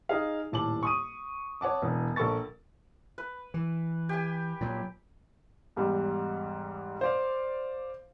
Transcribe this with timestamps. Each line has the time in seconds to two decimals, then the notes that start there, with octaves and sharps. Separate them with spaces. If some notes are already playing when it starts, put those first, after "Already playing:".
0.09 D#4 G#4 F5
0.52 D#1 A2 A5 D6 F#7
0.83 C#6 D#6 D#7
1.61 C#5 F#5 A5 D6
1.82 E1 B3
2.16 A#1 A4 A#4 A5 C#6 A6
3.18 B4
3.54 E3
4.09 G4 G#5
4.61 A#2 F#3
5.76 E2 G#2 G3
7.01 C5 D5 F5